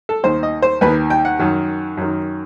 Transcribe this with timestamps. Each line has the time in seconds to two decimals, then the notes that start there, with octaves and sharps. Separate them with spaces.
0.09 A4
0.23 D#2 D#3 C5
0.43 D#5
0.62 C5
0.81 D#2 D#3 B4
1.10 G5
1.25 F#5
1.39 F#2 D#3
1.97 F#2 D#3